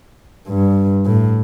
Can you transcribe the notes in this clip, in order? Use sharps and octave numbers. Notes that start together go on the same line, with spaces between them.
G2
A2